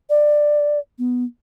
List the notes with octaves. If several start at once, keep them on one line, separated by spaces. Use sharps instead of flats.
D5
B3